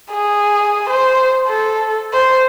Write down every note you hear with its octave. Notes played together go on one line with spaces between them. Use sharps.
G#4
C5
A4
C5